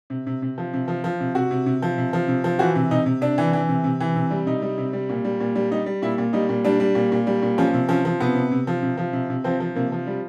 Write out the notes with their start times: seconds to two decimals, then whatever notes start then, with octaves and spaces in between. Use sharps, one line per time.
0.10 C3
0.27 C3
0.42 C3
0.58 F3
0.73 C3
0.88 F3
1.04 F3
1.20 C3
1.35 C3 F#4
1.51 C3
1.66 C3
1.82 F3
1.98 C3
2.13 F3
2.28 C3
2.44 F3
2.59 E3 F#4
2.75 C3
2.91 C3 D#4
3.06 C3
3.21 C3 D4
3.38 E3
3.53 E3
3.69 C3
3.84 C3
4.00 E3
4.16 C3
4.31 G3
4.46 C3 D#4
4.62 G3
4.78 C3
4.93 G3
5.09 A#2
5.25 G3
5.40 A#2
5.55 G3
5.71 G3 D#4
5.86 G3
6.02 A#2 E4
6.18 A#2
6.33 G3 D#4
6.49 A#2
6.65 G3 D4
6.80 G3
6.95 A#2
7.12 A#2
7.27 G3
7.42 A#2
7.58 F3 C#4
7.74 C3
7.89 F3 C#4
8.05 F3
8.20 C3 B3
8.35 C3
8.51 C3
8.67 F3
8.83 C3
8.98 F3
9.13 C3
9.30 C3
9.44 F3 C4
9.60 F3
9.75 C3 A#3
9.92 F3
10.07 G3